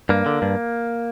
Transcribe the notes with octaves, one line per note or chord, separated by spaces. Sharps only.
G2 A#3
D3
G2